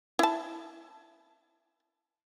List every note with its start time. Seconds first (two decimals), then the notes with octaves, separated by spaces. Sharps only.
0.19 E4 A5